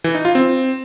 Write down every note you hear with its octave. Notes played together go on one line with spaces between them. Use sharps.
E3
D#4
F4
C4